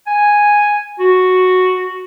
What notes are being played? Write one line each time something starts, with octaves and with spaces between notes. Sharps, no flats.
G#5
F#4